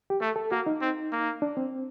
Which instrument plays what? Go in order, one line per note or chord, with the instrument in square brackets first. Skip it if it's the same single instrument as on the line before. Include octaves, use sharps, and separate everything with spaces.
[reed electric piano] G4
[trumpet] A3 [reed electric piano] A4
[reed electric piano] A4
[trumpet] A#3 [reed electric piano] F#4
[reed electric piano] D#4
[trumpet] C4
A#3
[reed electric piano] D4
C4